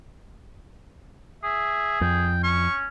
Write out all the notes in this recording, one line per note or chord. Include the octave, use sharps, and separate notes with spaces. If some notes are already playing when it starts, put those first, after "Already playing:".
G#4 E5
F2 G5
C#4 C#6